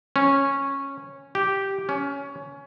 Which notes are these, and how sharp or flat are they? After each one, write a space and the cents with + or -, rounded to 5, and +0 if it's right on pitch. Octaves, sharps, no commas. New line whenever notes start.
C#4 -10
G4 -5
C#4 +15